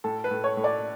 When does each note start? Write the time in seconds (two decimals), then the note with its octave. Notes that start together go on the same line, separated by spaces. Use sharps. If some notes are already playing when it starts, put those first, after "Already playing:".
0.04 A2 A4
0.24 B4
0.31 A2
0.44 C#5
0.57 A2
0.64 D5